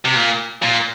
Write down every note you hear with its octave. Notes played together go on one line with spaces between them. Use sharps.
C3
A#2
A#2